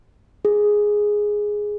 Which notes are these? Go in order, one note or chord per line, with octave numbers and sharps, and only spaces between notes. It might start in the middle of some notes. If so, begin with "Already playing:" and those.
G#4